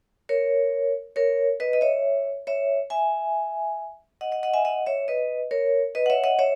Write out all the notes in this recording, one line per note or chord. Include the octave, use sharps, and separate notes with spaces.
A#4 C#5
A#4 C#5
B4 D#5
D#5
C#5 E5
C#5 E5
E5 G#5
D#5 F#5
D#5 F#5
D#5 F#5
E5 G#5
D#5 F#5
C#5 E5
B4 D#5
A#4 C#5
B4 D#5
F#5
C#5 E5
D#5 F#5
C#5 E5